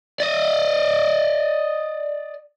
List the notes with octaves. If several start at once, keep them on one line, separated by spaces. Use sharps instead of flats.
D5 D#5